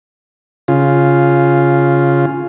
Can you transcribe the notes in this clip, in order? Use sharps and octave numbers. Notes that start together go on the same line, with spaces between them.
C#3 F4